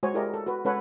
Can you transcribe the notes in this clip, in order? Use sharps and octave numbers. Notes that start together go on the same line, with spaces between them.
G#3 F#4 C5 C#5 G#5
E4 G4 G#4 A#4 D5 D#5
A4
F#4 B4
G#3 C#4 A4 B4 C#5 F#5